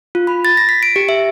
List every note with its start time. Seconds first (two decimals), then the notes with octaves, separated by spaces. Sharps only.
0.15 F4
0.27 B5
0.45 A6
0.57 A#6
0.69 B6
0.83 D7
0.96 G4
1.09 E5